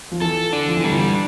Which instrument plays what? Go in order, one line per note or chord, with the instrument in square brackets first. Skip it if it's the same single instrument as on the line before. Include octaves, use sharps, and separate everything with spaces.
[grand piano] F3
[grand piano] E3 [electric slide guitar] A4
[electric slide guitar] D4
[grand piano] F3
E3
[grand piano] D3 [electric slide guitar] G3
[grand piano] E3